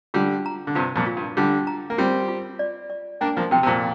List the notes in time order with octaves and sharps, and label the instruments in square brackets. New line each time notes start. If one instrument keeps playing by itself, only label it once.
[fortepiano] D3 G3 [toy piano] F4
[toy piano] A#5
[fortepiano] D3
[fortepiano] G2 C3 [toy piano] F4
[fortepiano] F2 A#2
[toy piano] F4
[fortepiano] G2
[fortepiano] D3 G3 [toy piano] F4
[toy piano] A#5
[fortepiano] A#3
[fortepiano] G3 C4 [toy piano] F4
[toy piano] F4
D5
D5
[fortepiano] A#3 D4 [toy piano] G5
[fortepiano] F3 A#3
[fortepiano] C3 F3 [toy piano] G5
[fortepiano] C3
F2 A#2